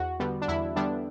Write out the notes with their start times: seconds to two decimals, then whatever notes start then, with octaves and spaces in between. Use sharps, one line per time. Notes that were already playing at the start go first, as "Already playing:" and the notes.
Already playing: E2 F#4
0.20 D3 G3 B3
0.42 D4
0.48 E2 E4
0.76 D3 G3 B3 D4